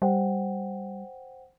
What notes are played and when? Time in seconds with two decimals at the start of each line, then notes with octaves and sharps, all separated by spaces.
0.02 G3 C5 F#5 G5